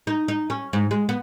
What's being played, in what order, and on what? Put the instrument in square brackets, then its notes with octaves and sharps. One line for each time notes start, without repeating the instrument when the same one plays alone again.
[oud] D#4
D#4
C#4
G#2
G#3
B3